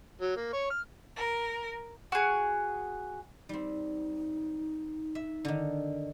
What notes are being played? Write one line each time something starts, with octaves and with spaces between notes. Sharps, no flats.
F#3
A#3
C#5
F6
A#4
F#4 G#4
G3 C4 D#4
E5
D3 D#3